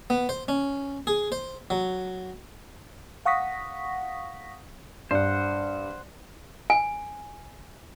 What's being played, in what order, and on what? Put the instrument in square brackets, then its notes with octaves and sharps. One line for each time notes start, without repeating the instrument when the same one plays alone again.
[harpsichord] B3
C5
C#4
G#4
C5
F#3
[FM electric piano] F5 F#5 C#6 D#6 A#6 B6
[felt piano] G2 [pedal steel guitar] C5 F#5
[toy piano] G#5